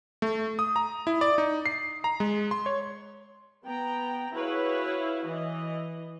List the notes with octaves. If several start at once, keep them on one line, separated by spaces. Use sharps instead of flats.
A3
D#6
A#5
E4
D5
D#4
C7
A#5
G#3
C6
C#5
B3 G5 A#5
E4 F#4 G#4 B4 C#5 F5
E3 D#5